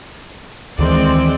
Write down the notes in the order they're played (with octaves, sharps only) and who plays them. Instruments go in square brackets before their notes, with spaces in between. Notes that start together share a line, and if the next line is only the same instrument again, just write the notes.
[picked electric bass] D2 D#3 E3 [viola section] G#3 C4 D5